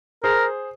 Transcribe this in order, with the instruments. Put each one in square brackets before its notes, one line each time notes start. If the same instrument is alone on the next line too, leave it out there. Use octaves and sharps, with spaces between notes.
[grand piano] G#4 C5 [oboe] A#4